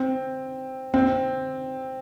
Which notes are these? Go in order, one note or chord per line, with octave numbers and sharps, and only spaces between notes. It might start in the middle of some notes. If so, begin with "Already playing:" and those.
Already playing: C4
C4